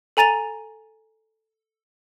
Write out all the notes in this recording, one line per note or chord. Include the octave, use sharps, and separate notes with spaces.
A4 G#5 A#5 A6 D#7 F7